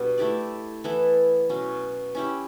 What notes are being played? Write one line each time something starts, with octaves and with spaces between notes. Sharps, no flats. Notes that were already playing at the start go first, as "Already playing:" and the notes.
Already playing: B2 G3 D4
A3 E4 G4 D5
E3 B3 E4 A4
B2 F#3 C#4
C#4 E4 G4